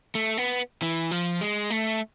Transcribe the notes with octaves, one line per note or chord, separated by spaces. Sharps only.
A3
B3
E3
F3
G#3
A3